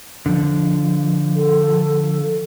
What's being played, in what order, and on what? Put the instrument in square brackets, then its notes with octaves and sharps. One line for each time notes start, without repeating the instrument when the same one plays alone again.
[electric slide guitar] D3 F3
[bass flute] A4